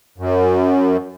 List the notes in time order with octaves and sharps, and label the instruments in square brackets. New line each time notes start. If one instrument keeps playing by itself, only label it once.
[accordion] F#2